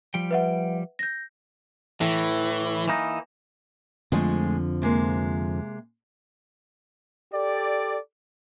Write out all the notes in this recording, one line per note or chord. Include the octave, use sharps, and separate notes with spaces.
F3 G3 G5
B4 E5 F#5
G6 A#6
A2 E3
E3 A#3 D#4
F2 D3 F3 G#3 A3
C3 G#3 A#3
G4 A4 D5